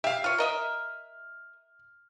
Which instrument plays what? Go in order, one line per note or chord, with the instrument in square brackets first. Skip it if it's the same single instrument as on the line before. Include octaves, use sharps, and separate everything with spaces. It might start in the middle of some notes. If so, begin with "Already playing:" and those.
[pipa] G4 [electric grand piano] E5 F5
[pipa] F4 C#5 [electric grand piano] F6
[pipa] A#4 D#5 E5